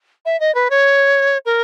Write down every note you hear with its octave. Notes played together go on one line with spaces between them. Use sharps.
E5
D#5
B4
C#5
A#4